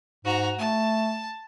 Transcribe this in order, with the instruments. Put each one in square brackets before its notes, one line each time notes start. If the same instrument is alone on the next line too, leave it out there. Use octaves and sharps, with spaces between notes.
[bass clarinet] G#2 [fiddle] F#4 A#5
[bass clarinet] A3 [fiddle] A5